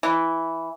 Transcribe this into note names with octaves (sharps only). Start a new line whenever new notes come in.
E3